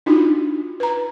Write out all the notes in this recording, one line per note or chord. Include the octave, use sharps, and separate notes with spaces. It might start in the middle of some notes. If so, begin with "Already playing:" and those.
D4 D#4 F4 F#4
B4 A#5